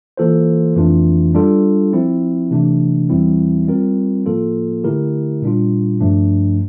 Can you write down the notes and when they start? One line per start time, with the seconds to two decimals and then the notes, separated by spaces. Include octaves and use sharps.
0.17 E3 A#3 F4 A4 C5
0.76 F2 E3 A3 D4 F4
1.35 G3 D4 F4 A4
1.93 F3 C4 E4
2.51 C3 E3 A3 D4
3.10 E2 E3 G3 C4 E4
3.67 G3 C4 F4 A#4
4.26 A2 F3 A#3 F4 A4
4.84 D3 A3 E4 G4 A#4
5.42 A#2 G3 D4 F4
6.00 G2 F3 A3 D4